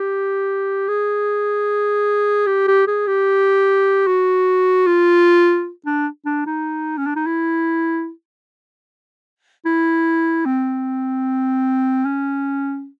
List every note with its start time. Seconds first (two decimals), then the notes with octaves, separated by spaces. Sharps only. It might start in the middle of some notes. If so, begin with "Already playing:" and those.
Already playing: G4
0.88 G#4
2.47 G4
2.68 G4
2.87 G#4
3.07 G4
4.07 F#4
4.87 F4
5.86 D4
6.26 D4
6.46 D#4
6.97 C#4
7.07 D4
7.16 D#4
7.26 E4
9.65 E4
10.45 C4
12.05 C#4